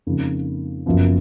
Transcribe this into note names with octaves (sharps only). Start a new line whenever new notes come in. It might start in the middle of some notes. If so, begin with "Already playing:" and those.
F2 C#3 F3 A#3 D#4
F#1 F#2 F3 B3 F4